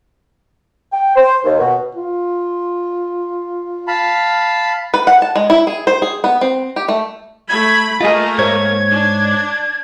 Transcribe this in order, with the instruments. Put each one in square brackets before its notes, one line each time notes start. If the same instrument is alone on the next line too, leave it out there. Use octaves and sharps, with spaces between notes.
[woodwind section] G5
C5
D#2
B2
[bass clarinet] F4
[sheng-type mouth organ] F5 A5 B5
[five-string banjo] B4
F#5
A5
G#3
E4
G#4
C5
G#4
B3
C4
G4
A3
[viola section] A3 B5 [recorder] G#6
[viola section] A3 A#3 A#4 [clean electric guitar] F4 G#4 [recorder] D#5
[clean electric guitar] G#2 C5 C#5 [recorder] G#6
[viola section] D4